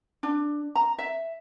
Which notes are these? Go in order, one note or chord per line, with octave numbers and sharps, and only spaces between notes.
D4
A#5
E5